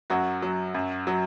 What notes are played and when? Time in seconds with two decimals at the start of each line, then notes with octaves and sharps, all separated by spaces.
0.10 F#2 F#3 F#4
0.42 F#3
0.74 F#2
1.07 F#3